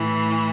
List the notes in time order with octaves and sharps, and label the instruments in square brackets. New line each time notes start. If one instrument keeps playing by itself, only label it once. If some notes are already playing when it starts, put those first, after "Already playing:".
Already playing: [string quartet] A2 E3